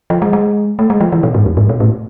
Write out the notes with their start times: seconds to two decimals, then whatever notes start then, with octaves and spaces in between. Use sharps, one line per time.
0.10 F3
0.22 G#3
0.33 G#3
0.79 A3
0.90 G#3
1.01 F3
1.12 E3
1.23 B2
1.35 G#2
1.46 F2
1.57 G#2
1.69 B2
1.80 A2